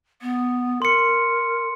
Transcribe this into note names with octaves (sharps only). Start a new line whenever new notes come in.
B3
A#4 C6 C#7